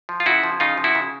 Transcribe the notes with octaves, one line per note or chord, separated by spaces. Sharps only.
F3
F4
C#3 E4 F#4
F3
C#3 D#4 F4
F3
E4 F#4
C#3